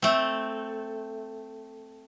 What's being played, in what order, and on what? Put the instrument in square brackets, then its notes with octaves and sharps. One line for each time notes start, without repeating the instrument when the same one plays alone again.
[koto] A3 C4